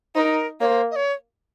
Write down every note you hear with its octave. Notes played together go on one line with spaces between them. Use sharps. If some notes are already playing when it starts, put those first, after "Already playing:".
D#4 A#4 C5
A#3 C#5
C5
D#5
C#5